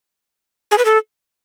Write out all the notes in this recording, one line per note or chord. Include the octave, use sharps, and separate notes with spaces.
G#4
B4
A4